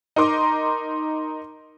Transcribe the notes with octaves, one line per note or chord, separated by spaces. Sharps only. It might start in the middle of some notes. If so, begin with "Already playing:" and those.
D#4 A#4 C6 D6